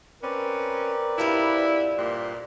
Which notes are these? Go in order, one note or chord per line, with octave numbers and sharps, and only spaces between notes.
C4 C#4 A#4 B4 D5
G2 F3 G3 E4
A#2 G4 C6 F#6